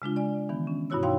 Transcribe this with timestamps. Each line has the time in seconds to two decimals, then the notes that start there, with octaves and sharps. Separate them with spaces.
0.02 C#3 G#3 D4 F4
0.16 D5 G#5
0.49 D#3 E3 B3
0.67 C#4
0.90 G2 B2 E4 F#4 C#5 E6
1.03 D#4 F#4 C#5 F5 G5 C6